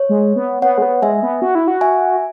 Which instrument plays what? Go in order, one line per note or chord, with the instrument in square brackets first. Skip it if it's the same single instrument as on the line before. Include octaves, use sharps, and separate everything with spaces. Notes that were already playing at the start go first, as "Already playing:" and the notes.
Already playing: [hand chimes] C#5
[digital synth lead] G#3
B3
[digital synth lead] B3 [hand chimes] C#5 F#5
[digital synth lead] G#3
B3
[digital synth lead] G#3 [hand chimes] E5 G#5
[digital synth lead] B3
F#4
E4
F#4
[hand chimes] E5 G#5